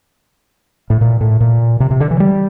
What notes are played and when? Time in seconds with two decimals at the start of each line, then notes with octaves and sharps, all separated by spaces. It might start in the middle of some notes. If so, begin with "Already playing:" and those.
0.90 A2
1.01 A#2
1.21 A2
1.40 A#2
1.80 C3
1.91 C3
2.00 D3
2.11 E3
2.20 G3